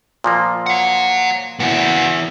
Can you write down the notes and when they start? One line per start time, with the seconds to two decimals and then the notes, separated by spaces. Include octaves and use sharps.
0.24 A#2 F3 A#3
0.66 C#5 F#5
1.60 C#3 B3 E4 F#4